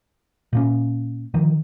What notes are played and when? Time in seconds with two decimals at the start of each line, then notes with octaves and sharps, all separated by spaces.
0.53 A#2 A#3 C#4
1.34 D3 D#3 F3